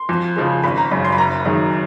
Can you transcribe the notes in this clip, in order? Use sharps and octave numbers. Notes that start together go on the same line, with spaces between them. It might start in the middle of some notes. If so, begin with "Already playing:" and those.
Already playing: C6
F2
C#3 F3 G#3
G#1 B5
A#5
F#2 C#3 B5
C6
B5
F#1 A#5
F#2 D#3 G#3